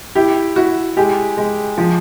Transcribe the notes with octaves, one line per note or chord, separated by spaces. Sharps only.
E4 G4
E4 F#4
G#3 G4
G#3
F3